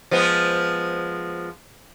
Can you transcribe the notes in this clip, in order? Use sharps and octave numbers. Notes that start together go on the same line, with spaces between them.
F3 G#3 B3